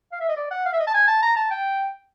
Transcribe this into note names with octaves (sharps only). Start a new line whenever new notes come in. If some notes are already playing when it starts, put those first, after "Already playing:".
F5
E5
D#5
D5
F#5
F5
E5
D#5
A5
G#5
A5
A#5
A5
G5